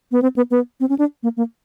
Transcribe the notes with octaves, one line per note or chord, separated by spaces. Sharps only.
B3
C4
B3
B3
C4
C#4
D4
A#3
A#3